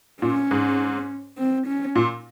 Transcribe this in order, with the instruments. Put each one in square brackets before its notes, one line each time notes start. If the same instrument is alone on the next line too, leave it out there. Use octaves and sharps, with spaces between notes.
[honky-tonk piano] A#2 [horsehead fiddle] C#4
[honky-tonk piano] G#2
[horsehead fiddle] C4
C#4
[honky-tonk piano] A#2